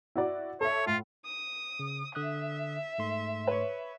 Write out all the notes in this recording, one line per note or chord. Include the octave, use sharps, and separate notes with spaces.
E4 F#4 D5
A4 C#5 E5
A2 F4
D#6
C#3
D3 E5 D#6 F#6
G#2 A3 C6
B4 C#5